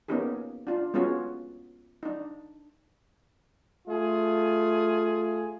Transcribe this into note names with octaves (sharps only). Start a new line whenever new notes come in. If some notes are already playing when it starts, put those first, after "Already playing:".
A#3 B3 C#4 D#4 G4 G#4
D4 F4
G#3 B3 C#4 F4 F#4 G#4
D4 D#4
A3 F4 G#4